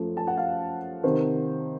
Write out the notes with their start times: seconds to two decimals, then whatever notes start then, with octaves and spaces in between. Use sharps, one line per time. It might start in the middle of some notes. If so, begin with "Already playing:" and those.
Already playing: F#2 F3 A3
0.17 A5
0.27 F#5
0.38 F5
1.03 C3 D#3 C5